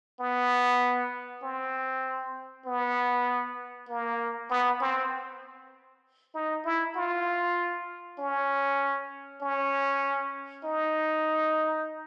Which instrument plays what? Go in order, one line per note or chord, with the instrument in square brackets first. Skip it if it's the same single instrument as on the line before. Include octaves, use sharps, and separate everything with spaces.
[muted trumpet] B3
C4
B3
A#3
B3
C4
D#4
E4
F4
C#4
C#4
D#4